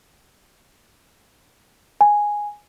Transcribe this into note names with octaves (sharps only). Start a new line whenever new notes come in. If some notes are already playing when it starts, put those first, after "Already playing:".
G#5